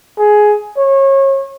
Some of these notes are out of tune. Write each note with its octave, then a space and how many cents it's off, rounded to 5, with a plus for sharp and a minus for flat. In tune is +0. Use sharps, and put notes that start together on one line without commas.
G#4 +10
C#5 -30